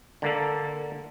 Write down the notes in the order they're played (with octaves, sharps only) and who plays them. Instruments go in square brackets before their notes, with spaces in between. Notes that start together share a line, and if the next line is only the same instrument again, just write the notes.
[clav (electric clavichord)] D3 A#3 A4